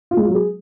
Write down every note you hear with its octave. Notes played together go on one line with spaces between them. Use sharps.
F4
G#3
F4
F#3
G#4